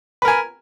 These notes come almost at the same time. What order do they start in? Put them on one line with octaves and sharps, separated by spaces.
B4 A#4 G#5